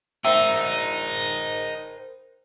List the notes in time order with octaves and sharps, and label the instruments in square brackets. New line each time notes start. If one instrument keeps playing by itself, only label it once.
[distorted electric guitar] D#4 [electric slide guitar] A#4 C5 G5 [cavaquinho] E5